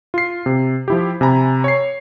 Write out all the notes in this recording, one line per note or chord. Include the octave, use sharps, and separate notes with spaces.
F4 C7
C3
F3 E4 G4
C3 G#5 A#5 B5
C#5 C7